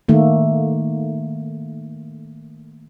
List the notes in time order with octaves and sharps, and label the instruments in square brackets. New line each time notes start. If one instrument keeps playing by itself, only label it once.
[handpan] D#3 A3 A#3